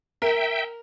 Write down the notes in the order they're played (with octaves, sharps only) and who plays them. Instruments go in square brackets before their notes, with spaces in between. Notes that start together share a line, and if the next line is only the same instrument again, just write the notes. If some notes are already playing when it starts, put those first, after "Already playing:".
[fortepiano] A#4 [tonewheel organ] E5 G5